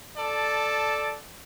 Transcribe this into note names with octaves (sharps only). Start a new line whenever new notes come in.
A4 D5 A5